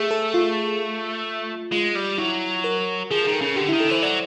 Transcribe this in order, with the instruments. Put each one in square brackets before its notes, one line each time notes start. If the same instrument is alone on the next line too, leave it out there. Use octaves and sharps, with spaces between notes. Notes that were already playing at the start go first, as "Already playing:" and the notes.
Already playing: [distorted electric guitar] A3 [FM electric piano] G#4
[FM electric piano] A4
F4
[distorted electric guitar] G#3 [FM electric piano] F4
[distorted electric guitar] G3
[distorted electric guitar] F#3 [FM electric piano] E4
[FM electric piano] A#4
[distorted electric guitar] F3 [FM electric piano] G#4
[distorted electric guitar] D#3 [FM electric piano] G#4
[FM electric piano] A4
[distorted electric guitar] C#3
[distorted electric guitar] D3 [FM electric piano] G4
[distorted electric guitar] D#3 [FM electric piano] E4
[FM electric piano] A4
[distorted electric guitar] E3 [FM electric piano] C5
[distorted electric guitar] F#3 [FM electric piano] D5